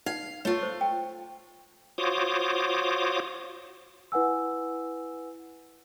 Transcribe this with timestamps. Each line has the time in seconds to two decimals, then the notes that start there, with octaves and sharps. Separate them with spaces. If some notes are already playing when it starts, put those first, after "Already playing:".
0.06 D#4 F5
0.45 A3 F4 C#5
0.63 C5
0.81 G5
1.98 F4 F#4 C5 C#5 D6 D#6
4.12 E4 B4 F#5 G#5 E6